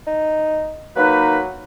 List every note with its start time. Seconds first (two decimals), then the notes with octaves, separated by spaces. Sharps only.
0.07 D#4
0.96 F#3 A#3 D#4 B4